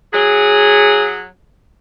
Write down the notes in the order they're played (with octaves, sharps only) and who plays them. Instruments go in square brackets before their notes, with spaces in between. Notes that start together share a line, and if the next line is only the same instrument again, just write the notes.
[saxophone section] F#3 G#4